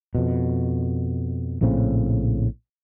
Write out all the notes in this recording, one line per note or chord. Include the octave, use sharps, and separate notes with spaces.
F2 B2
A#1 A2 C#3 C4